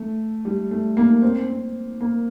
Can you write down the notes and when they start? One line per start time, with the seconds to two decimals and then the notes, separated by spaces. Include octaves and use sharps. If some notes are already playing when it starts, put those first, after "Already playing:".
Already playing: A3
0.45 G3
0.71 A3
0.97 A#3
1.22 C4
1.50 C4
2.01 A#3